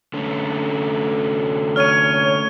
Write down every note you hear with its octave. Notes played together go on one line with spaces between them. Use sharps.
D3 A3 C#4
C#5 F6 D#7